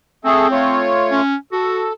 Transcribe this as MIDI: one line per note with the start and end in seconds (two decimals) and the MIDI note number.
0.25 0.47 57
0.25 0.94 60
0.25 0.47 68
0.25 0.47 69
0.51 1.21 57
0.51 1.21 65
0.51 1.21 73
1.11 1.36 61
1.52 1.88 66
1.52 1.93 69